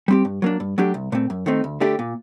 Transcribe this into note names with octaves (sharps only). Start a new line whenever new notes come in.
G3 C4 G4
G2
F#3 A#3 D4
G2
F#3 A3 D4 G4
C2
A#2 A3 C4
F#2
D#3 A3 C4 D#4
D2
D3 A3 D4 G4
A#2